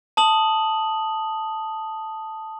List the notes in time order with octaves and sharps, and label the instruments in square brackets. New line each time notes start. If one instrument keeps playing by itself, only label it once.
[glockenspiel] A5 D#6 F#7